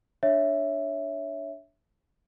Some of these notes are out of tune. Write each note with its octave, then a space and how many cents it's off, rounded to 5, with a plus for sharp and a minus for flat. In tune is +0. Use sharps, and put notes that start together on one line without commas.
D4 +0 C#5 +0 E5 +0